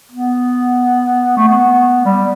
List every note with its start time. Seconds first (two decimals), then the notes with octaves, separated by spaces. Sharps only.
0.12 B3
1.37 A3
1.48 B3
2.05 G3